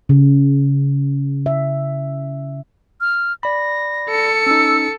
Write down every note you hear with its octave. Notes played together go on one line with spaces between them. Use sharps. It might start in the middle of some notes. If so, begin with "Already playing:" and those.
C#3
E5
F6
D5 B5 A#6
A4 C#7
C#4 D#4 E6